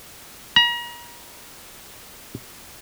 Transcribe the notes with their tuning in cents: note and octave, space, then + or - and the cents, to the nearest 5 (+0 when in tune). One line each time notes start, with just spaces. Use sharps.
A#5 +40